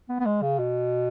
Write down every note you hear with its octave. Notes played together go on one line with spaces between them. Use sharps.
B3
B3
G#3
C#3
B2